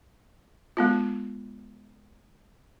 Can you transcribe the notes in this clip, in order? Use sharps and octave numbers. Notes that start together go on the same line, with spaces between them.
G#3 B3 F4